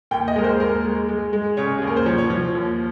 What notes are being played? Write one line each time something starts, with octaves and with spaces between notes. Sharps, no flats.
D#2 G5
D#5
G#3 A#4
C5
D#2 A#4
G#3
G#3
G#3
C#3 C#5
D#2 G#4
A#4
C5
F3 C#5
C#5
F3 C#5
D#2